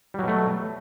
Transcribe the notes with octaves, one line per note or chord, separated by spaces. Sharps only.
B2 F#3 G3 A3